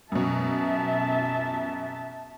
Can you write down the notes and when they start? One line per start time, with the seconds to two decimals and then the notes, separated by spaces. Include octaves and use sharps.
0.12 F#2 B2 E5 A5